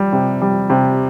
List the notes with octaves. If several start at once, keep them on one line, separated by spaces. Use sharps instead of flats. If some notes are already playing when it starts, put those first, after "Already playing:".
Already playing: G3
C3
G3
C3